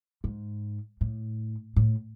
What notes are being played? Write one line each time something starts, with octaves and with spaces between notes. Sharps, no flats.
G#2
A2
A2